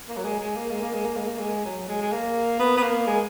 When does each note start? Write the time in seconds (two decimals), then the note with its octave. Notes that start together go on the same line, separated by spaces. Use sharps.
0.09 A#3
0.17 F#3
0.24 G#3
0.40 G#3
0.56 A#3
0.71 G#3
0.82 A#3
0.94 G#3
1.05 A#3
1.17 G#3
1.28 A#3
1.39 G#3
1.65 F#3
1.89 G#3
2.02 G#3
2.12 A#3
2.59 B3
2.77 B3
2.83 A#3
3.07 G#3